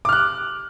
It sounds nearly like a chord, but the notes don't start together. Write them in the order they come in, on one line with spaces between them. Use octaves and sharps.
D6 F6 F#6